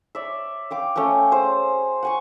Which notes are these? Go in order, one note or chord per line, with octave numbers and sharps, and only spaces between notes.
C#5 D5 E5
F5 G5 D6
A3 C#4 C#5 G5
G#4 C5
F#5 G#5 C#6